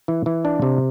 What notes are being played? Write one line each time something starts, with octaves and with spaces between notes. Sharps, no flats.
E3
E3
D4
C3